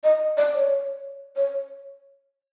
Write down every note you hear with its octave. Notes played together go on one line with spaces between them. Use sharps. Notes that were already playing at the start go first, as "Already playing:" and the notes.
D#5
D5
C#5
C#5